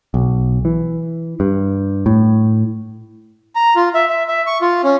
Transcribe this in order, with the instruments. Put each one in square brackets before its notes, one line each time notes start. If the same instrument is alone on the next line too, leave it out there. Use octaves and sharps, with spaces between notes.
[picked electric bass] B1
E3
G2
A2
[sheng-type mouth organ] A#5
F4
E5
E5
E5
C#6
F4
C#4